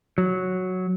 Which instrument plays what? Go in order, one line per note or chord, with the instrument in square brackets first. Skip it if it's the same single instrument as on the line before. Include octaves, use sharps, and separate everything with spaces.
[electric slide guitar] F#3